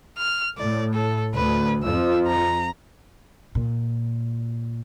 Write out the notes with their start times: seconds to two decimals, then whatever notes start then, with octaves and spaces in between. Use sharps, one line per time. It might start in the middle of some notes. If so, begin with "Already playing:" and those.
0.18 F6
0.58 A2 D5
0.94 A4
1.34 D2 B4
1.83 F2 F3 E6
2.27 A#5
3.55 A#2